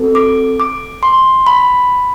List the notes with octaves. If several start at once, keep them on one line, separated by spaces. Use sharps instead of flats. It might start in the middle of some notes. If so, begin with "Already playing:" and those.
Already playing: C4 F#4 A4
D6
D6
C6
B5